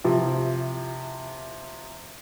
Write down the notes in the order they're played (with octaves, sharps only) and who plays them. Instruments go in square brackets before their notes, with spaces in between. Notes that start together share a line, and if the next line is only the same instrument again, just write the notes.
[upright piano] C3 F3 E4